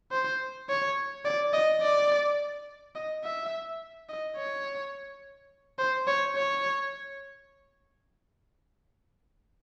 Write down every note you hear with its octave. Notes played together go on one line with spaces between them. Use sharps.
C5
C#5
D5
D#5
D5
D#5
E5
D#5
C#5
C5
C#5
C#5